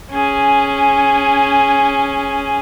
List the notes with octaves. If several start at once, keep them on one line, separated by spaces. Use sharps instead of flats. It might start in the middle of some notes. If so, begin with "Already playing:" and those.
C#4 G#4